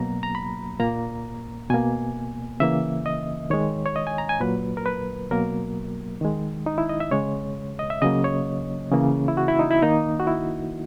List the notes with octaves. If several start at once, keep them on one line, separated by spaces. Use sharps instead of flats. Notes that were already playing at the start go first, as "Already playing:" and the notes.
Already playing: B2 F#3 A#3 A#5
A#5
B5
A#2 A#3 A#5
B2 A#3 G#5
C#3 E3 A#3 E5
D#5
D#3 G#3 C#5
C#5
D#5
G#5
A#5
G#5
A#2 F#3 A#3 B4
A#4
B4
B2 F#3 A#3 A#4
D#3 G#3
D#4
E4
D#5
E5
C#3 G#3 C#5
D#5
E5
C#3 F#3 A#3 D#5
C#5
C#3 E3 A#3
E4
F#4
E4
D#4
E4
D#3 A#3 D#4
F#4
E4